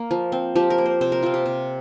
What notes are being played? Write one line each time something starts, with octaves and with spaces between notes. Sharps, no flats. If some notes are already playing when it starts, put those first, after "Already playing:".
Already playing: A#3
F3
C4
F3 G4
A#4
A#3
C5
C3 C5
A#4
F3 C4 F4
G4
C3